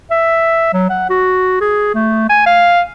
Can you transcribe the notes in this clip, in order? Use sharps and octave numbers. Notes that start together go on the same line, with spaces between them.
E5
F#3
F#5
F#4
G#4
A3
G#5
F5